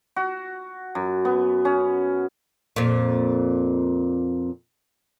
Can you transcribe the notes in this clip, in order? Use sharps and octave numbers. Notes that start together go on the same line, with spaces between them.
F#4
F#2
B3
C#4
F2 A#2